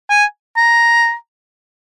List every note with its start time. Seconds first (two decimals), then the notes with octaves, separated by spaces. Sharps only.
0.10 G#5
0.57 A#5